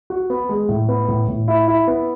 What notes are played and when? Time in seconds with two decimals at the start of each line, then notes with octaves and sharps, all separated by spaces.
0.10 F#4
0.30 B3
0.49 G#3
0.69 A2
0.89 B3
1.08 A2
1.28 A2
1.48 E4
1.68 E4
1.87 B3